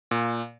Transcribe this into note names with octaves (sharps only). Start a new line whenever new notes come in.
A#2